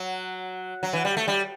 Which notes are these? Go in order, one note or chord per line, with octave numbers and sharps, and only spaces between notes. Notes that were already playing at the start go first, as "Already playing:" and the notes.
Already playing: F#3
F#3
E3
G3
A3
G3